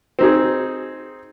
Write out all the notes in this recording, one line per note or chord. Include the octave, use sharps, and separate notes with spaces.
C4 D#4 G#4